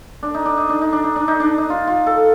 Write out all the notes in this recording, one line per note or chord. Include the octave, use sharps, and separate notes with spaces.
D4
D#4
D4
D#4
D4
D#4
D4
D#4
D4
D#4
D4
D#4
F4
F4
A4